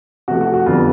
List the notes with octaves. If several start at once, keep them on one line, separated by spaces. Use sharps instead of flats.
C3 F3 A3 F#4
F#4
F#4
F2 D3 G3 B3 F4